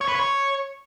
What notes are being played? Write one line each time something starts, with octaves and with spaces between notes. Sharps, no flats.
C#5
B4
C#5